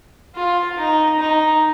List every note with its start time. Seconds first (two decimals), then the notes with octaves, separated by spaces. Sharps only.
0.35 F4
0.78 D#4
1.19 D#4